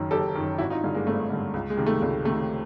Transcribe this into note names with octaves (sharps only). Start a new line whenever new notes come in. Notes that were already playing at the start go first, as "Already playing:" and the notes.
Already playing: F#1 F#2 D#3
F#1 G4 A4
F#2 D#3
G#1 E4 F#4
D#4 F4
G2 D3
G#3 A#3
G#1 A3
G2 D3
C#2
G#3
C3 D#3
A3
C#2 A3
C3 D#3 A3